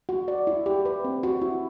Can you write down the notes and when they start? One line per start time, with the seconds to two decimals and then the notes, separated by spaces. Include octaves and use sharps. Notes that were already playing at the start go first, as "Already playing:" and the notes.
0.09 F#4
0.28 D5
0.47 E4
0.66 G4
0.85 B4
1.04 C4
1.23 F#4
1.41 E4